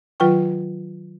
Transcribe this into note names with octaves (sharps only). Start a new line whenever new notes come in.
D#3 F#3 F4 B4 G5 C#6